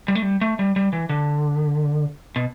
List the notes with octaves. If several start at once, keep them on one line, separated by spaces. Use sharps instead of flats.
G3
A3
G3
A3
G3
G3
E3
D3
B2